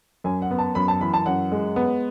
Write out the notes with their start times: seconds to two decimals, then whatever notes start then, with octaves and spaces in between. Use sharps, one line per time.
0.24 F#2 G#5
0.42 F#5
0.51 B3
0.59 A5
0.75 F#2 B5
0.88 A5
1.01 E3 B5
1.14 A5
1.26 F#2 F#5
1.52 G#3
1.76 B3